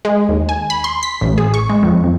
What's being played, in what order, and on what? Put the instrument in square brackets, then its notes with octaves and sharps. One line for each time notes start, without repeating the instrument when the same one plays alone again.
[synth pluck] G#3
D#2
G#5
B5
C6
B6
A1
G#4
C#6
G#3
F2
F2